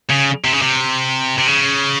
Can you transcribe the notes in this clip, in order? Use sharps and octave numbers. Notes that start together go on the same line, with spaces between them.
C#3
C3
C#3
C3
C3
C#3